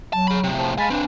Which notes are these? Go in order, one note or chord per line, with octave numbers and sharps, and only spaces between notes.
F#3 A5
G#4 B5
A2 C3
F3
G#3 F5 G#5 A5 B5
G2 E3 C4 D4